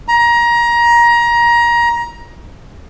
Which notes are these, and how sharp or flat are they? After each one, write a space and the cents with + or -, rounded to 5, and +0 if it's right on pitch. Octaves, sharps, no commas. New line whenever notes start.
A#5 +25